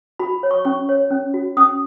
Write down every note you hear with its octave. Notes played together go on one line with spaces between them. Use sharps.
F#4 B5
C#5
C#6
C#4 C#6
C#5
C#4
F#4
C#4 D#6